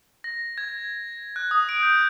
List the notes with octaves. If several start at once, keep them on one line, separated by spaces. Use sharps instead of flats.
A#6
G#6
F#6
D#6
D7
G6